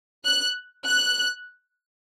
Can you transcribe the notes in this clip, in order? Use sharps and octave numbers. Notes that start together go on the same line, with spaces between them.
F#6
F#6